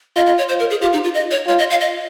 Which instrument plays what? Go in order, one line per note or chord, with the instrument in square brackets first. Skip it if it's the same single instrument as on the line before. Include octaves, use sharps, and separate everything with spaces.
[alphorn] F4 [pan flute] D#5
[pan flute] D#5
C#5
C5
A#4
G#4
[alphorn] F4 [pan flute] G4
[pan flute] D#4
F4
D#5
C#5
[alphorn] F4 [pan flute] C#5
[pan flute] D#5
F5
D#5